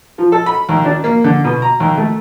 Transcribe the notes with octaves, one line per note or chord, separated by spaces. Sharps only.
F3
A4
B5
D#2
D4
A#3
D3
B2
A#5
D#2
A3